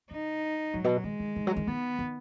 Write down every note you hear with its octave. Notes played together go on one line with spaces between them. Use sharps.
C#3 D#4
G#2 F#3
B2
D#3 G#3
D#3
D#3
F#3
D#3
D#3 B3
D#3